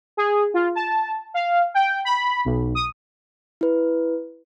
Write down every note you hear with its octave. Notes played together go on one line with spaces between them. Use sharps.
G#4
F4
A5
F5
G5
B5
B1
D#6
E4 B4